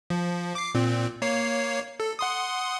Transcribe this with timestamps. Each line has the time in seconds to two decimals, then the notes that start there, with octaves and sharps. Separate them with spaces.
0.10 F3
0.55 D6 C7
0.75 A#2 C4
1.22 A#3 C#5 C7
2.00 A4
2.19 F#5 C6 D#6